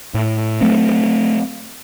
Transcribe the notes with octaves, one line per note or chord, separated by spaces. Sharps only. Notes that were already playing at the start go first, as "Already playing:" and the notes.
A2
F#3 A3 C4